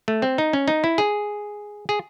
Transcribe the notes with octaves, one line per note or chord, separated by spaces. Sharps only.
A3
C4
D#4
C#4
D#4
E4
G#4
G#4